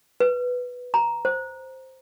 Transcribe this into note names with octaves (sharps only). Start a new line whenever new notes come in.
B4
A#5
C5